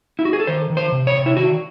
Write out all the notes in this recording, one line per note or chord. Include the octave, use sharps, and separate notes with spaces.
E4
F#4
G#4
A4
D#3 C5
D#3
C5
C3
C#5
C3
E4
D#3 F#4